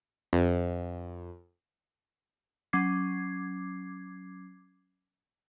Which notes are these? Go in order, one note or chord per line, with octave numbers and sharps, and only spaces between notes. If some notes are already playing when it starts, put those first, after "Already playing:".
F2
F#3 C#4 D6 G#6 C7